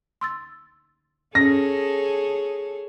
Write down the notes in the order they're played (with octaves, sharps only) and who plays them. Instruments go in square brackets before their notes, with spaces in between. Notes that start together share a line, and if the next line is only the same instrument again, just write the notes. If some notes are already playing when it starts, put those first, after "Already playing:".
[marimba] C6 E6 A6
[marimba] C#4 [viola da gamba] G#4 A4 C#5 [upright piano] A#6